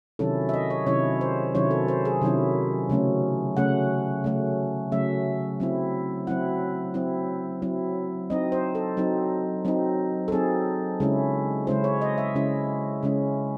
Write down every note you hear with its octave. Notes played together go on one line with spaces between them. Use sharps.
C3 D#3 F#3 C#4 E4 A4
E5
D#5
C#5
C3 D#3 F#3 C#4 E4 C#5
C5
C3 D#3 F#3 C#4 E4 C#5
A4
C5
G#4
C3 D#3 F#3 C#4 E4
C#3 F#3 A3 C#4
C#3 F#3 A3 C#4 F#5
C#3 F#3 A3 C#4
C#3 F#3 A3 C#4 E5
F#3 C4 E4
F#3 C4 E4 F#5
F#3 C4 E4
F#3 C4 E4
F#3 C4 D#4 D#5
C5
A4
F#3 C4 D#4
F#3 C4 D#4
A4
F#3 C4 D#4 G#4
C#3 G#3 C#4 E4
C#3 G#3 C#4 E4 C5
C#5
D#5
E5
C#3 G#3 C#4 E4
C#3 G#3 C#4 E4